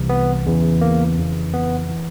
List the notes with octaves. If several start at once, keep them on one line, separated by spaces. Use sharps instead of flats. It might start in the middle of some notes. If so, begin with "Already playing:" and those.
Already playing: C2 C3 E3
B3
E2 C#3 E3
A#3
F2 C#3 E3
B3
E3